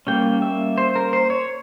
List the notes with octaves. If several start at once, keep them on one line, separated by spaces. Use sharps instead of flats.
G3 A#3 C#4 G5
E5
C5
A#4
C5
C#5